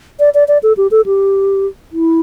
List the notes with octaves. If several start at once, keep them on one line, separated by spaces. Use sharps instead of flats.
D5
D5
D5
A4
G4
A4
G4
E4